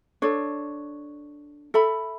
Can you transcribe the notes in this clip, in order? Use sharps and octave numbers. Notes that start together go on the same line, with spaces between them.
D4 A4 C#5
A4 E5 B5